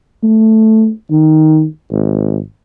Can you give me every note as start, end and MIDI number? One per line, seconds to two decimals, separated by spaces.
0.23 0.90 57
1.11 1.64 51
1.91 2.38 32